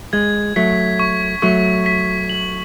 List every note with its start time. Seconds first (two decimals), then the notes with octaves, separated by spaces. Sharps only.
0.13 G#3 G#6
0.56 F#3 A3 B6
0.99 C#6
1.42 F#3 A3 C#6
1.86 B6
2.29 F#7